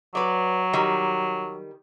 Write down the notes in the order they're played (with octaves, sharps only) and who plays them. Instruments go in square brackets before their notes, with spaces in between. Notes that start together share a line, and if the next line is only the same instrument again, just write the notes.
[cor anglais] F#3 [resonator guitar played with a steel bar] B4 D5
[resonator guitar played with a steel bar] D#3 G3